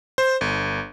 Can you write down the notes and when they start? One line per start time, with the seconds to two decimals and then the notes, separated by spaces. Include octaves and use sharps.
0.18 C5
0.41 G1